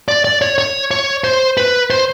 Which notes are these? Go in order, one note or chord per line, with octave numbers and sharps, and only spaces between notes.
D5
D5
C#5
C#5
C#5
C5
B4
C5